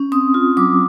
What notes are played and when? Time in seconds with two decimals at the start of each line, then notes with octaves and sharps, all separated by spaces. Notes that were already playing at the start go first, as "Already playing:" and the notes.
Already playing: C#4
0.12 C4 D#6
0.34 F4
0.57 F#3 D6